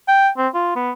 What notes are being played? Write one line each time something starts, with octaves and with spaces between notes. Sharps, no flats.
G5
C4
F4
B3